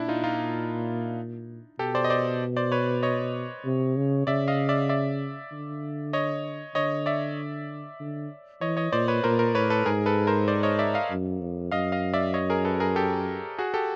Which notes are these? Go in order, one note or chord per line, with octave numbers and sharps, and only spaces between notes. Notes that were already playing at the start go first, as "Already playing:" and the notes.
Already playing: A#2 D4 E4
D#4 F4
D#4 F4
B2 G4 A4
C5 D5
D#5
C5 D5
C5 D5
B4 C#5
C#5 D#5
C3
C#3
C#3 D5 E5
D#5 F5
D5 E5
D5 E5
D3
C#5 D#5
D3 C#5 D#5
D5 E5
D3
E3 C#5 D#5
C#5 D#5
A#2 C5 D5
B4 C#5
A#2 A#4 C5
A#4 C5
A2 B4 C#5
A4 B4
G#2 G#4 A#4
A4 B4
A#4 C5
C5 D5
C#5 D#5
D5 E5
D#5 F5
F#2
F2
F#2 D#5 F5
D#5 F5
D5 E5
C#5 D#5
G#4 A#4
A4 B4
G#4 A#4
G4 A4
F#4 G#4
G4 A4